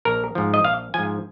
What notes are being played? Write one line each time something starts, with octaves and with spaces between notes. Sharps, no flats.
A#1 A#4
G#2 F3
D#5
A#1 F5
G#2 F3 G#5